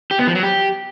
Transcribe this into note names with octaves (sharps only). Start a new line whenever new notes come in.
G4
B3
F3
F#3
G4